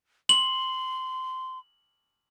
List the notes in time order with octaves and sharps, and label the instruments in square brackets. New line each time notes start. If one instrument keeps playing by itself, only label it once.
[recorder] C6 [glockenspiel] F#7